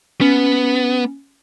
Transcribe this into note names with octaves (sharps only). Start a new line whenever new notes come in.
B3 C#4